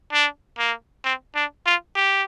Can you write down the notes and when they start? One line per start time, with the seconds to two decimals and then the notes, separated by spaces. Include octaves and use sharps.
0.13 D4
0.58 A#3
1.05 C4
1.35 D4
1.66 F4
1.95 G4